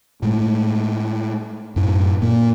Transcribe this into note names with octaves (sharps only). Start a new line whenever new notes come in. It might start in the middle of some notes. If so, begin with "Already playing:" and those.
A2 G#3 A3
F#2 A2
A#2 A#3